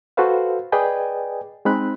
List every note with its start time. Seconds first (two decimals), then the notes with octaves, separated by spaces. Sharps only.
0.17 F#4 A4 B4 C5 F5
0.72 G#4 B4 D5 D#5 G5 G#5
1.65 G#3 C4 D#4 B5 F#6